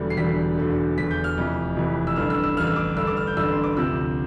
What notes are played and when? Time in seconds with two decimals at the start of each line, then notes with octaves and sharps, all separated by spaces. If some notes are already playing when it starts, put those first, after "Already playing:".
Already playing: E1 E2 D3 G3
0.10 C7
0.17 E1 E2 D3 G3 B6
0.57 E1 E2 D3
0.97 E1 E2 D3 B6
1.11 G6
1.24 F6
1.37 F1 F2 E3
1.76 F1 F2 E3
2.07 E6
2.16 A1 G2 D3 F6
2.30 E6
2.43 E6
2.57 A1 G2 D3 F6
2.67 E6
2.76 D6
2.97 A1 G2 D3 E6
3.07 D6
3.17 F6
3.27 G6
3.37 A1 G2 D3 E6
3.52 C6
3.64 D6
3.76 D2 C3 F3 E6